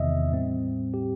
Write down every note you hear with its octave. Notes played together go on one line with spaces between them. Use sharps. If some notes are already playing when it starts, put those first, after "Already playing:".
Already playing: E2 C3 D#3 D#5 E5
A2 G3 C4
G4